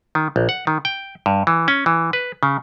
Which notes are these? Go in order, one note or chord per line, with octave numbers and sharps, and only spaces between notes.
D#3
A#1
F#5
D#3
G5
G2
E3
C#4
E3
B4
C#3